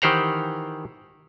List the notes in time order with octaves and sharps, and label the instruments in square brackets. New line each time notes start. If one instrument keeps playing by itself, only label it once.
[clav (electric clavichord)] D#3 E3 G4 C5 F#5 A#5